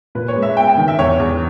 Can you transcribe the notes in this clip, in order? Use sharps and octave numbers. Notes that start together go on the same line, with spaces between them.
A#2 B4
C#5
G#3
E5
B3 G5
G5
D#3
E5
E2 C#5
E2